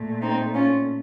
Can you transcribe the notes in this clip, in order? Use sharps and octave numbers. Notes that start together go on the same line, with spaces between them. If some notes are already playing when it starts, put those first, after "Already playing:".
Already playing: A#2 A3
C4 D#4
C#4 F4